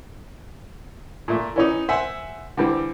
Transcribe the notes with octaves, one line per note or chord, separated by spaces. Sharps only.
A#2 A3
E3 C#4 D#4
C5 E5 F#5 G#5
D3 E3 G3 C4